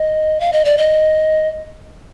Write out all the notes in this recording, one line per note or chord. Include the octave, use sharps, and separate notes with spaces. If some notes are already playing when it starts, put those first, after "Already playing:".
Already playing: D#5
F5
D#5
D5
D#5